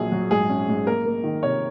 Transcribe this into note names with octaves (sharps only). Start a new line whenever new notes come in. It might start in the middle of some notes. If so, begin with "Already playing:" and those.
Already playing: A#1 F#3 G#4
F#3
G#2 G#4
C#4
G#2
A#3 A#4
A#3
D#3
C3 C#5